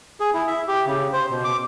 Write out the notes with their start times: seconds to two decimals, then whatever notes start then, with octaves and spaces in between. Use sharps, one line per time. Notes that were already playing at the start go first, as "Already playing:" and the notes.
0.20 G#4
0.34 E4
0.47 E5
0.68 G4
0.86 C#3
1.13 C5
1.30 B2
1.44 D6